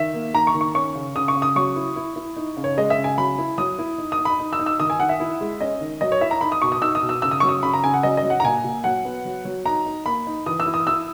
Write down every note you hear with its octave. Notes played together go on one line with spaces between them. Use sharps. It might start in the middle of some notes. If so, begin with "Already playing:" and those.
Already playing: D#3 E5
A#3
D#3 A#5
C#6
D#3
C#6
C#4 C#6
C#3
C#3 D#6
C#6
C#3
D#6
F#3 C#6
E4
E4
E4
D#4
C#3
C#5
G#3 D#5
E5
C#3
G#5
F#3 B5
E4
F#3 D#6
E4
D#4
D#6
D#4
B5
D#4
E6
D#4
E6
D#3 D#6
G#5
D#3 F#5
E5
E4
G#3
C#4 D#5
D#3
F#3 D#5
C#5
E4 E5
A#5
D#4 B5
D#6
B2 C#6
D#6
D#4 E6
D#6
B2
E6
C#3 E6
D#6
F#3 C#6
D#6
C#3 B5
A#5
C#3 G#5
F#5
F#3 D#5
D#5
F#3
F#5
A#5
A#2 G#5
A#2
F#3 F#5
B3
F#3
F#3
D#4 A#5
D#4
A#3 B5
D#4
E3 D#6
E6
E4
D#6
E4 E6